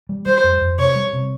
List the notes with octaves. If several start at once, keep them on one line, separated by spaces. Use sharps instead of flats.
G3
G3 C5
F2
F2
C3 C#5
G3
C3